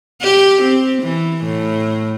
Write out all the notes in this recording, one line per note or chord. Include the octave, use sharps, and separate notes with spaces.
G4
C4
E3
A2